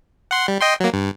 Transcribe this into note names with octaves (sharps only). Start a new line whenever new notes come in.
F#5 C6
G3
D#5 G5 C6
F#3 A#3
G2